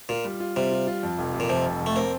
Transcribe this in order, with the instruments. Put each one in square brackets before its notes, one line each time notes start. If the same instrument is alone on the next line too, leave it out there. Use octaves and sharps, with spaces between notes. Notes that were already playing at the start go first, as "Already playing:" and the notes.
[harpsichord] A#2 [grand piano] F4
[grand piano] G3
F4
[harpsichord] C3 [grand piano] G3
[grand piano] F4
F4
F2
F1
F1
[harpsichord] A#2
[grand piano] F2 [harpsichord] C3
[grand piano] F1
F2
[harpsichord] A3
[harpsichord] A#3 [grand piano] C4